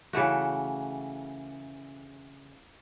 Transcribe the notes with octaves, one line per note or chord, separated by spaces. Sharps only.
C#3 E3 A3 F#4